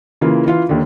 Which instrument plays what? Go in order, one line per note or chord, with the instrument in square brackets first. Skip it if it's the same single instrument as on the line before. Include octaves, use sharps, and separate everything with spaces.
[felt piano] C#3 E3 A#3 F4
E3 F4 F5
D#2 D3